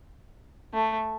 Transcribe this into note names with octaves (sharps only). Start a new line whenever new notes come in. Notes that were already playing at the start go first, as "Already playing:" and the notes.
A3